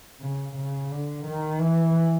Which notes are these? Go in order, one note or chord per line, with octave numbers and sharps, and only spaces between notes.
C#3
C#3
D3
D#3
E3